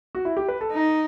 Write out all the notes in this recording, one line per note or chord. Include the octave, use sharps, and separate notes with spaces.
F#4
E4
G4
B4
A4
D#4